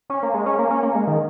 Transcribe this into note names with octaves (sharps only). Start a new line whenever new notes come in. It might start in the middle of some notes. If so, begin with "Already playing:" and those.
C#4
A#3
G#3
C#4
A#3
C#4
A#3
G#3
D#3